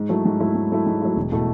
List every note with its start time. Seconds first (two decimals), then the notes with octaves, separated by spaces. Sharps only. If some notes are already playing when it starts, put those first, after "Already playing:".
Already playing: G#2
0.09 F#3 A3 E4
0.25 G#2
0.40 F#3 A3 E4
0.55 G#2
0.71 F#3 A3 E4
0.87 G#2
1.02 F#3 A3 E4
1.16 E1
1.32 B2 A3 E4